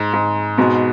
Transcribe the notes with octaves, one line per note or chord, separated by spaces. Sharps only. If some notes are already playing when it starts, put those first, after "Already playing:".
Already playing: G#2
G#2
G#2 B2